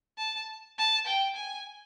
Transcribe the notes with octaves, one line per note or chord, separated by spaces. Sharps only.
A5
A5
G5
G#5